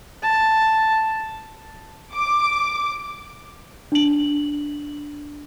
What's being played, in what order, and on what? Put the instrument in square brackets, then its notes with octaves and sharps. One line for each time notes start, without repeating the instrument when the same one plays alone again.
[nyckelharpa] A5
[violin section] D6
[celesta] D4 F#7